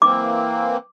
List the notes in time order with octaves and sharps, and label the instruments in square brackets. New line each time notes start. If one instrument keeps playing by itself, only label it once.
[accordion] E3 A#3 C4 [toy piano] D6